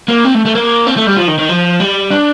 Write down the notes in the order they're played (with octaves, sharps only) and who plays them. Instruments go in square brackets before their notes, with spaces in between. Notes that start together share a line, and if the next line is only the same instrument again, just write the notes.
[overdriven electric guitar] A#3
C4
A3
A3
A#3
C4
A3
G3
F3
D#3
D#3
F3
G3
D4